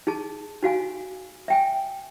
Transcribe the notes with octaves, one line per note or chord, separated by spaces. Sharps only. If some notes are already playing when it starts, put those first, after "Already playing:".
D#4 G#4 A5
D#4 F#4 F5 G#5
E5 G5 G#5